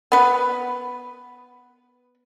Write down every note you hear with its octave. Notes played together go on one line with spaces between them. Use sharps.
B3 B4